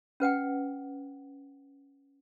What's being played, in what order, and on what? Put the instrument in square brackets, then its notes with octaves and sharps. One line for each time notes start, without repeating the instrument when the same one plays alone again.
[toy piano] C#4 B4 F#5 G5